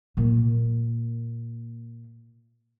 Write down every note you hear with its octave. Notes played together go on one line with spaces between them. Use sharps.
A#2 A#3